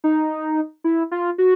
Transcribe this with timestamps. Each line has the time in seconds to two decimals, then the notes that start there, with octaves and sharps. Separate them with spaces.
0.04 D#4
0.84 E4
1.11 F4
1.38 F#4